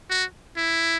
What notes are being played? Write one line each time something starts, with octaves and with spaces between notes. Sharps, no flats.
F#4
E4